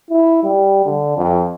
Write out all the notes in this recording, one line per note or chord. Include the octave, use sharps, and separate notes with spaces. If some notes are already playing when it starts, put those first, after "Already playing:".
E4
G3
D3
F2